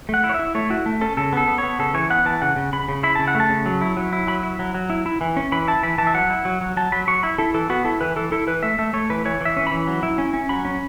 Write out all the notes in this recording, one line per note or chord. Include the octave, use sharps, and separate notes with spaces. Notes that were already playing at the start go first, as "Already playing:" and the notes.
A3 F#5
E4
C#5
E5
E4
A3 C#5
E4 F#4
A3
C#4 A4
C#3 A4
B3 A4
B3
C#5
B3
C#3 A4
E3 C#5
B3 F#5
E3 A5
C#3 F#5
C#3
C#3 B5
C#3
E4 B5
C#3 A5
F#5
A3
A5
C#3
F#3
E4
F#3
E4
F#3 B5
E4
F#3
F#3
E4
E4
E3
C#4
E3 B5
E4 A5
E3 B5
E3 A5
E5
F#3 F#5
E4
F#3
F#3
F#3 A5
F#3 B5
F#3 C#6
E4 B5
E4 A4
E3 A4
B3 F#4
E4 A4
E3 B4
E3 A4
E4 A4
E3 B4
A3 E5
A3 E5
A3 C#5
E3 B4
E3 C#5
E3 E5
C#4
E3 B5
F#3
E4
C#4
C#4
F#3 B5
C#4